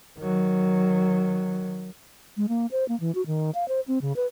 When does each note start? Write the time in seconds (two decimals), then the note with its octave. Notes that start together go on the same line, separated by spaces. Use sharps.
0.19 D#3 F#3
2.37 G#3
2.49 A#3
2.72 C5
2.88 A#3
3.00 E3
3.15 F#4
3.26 D#3
3.55 F5
3.68 C5
3.88 C4
4.01 C#3
4.16 B4